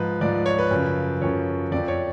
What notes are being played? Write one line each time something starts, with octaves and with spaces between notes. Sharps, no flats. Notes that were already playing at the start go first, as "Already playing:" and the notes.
Already playing: G#2 F3 B4
G#2 F3 D5
C#5
B4
F#2 C#3 F3
F#2 C#3 F3 C#5
F2 F3 D5
C#5